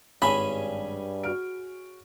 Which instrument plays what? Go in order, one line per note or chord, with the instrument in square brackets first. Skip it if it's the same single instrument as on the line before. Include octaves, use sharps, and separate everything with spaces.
[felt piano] G#1 [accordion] G2 G3 [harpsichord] C#4 G#4 E5 [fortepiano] B5
[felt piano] F#4 F6 D7